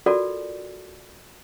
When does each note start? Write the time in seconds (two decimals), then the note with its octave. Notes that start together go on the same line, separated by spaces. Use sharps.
0.06 F4 F#4 A4 A#4 D5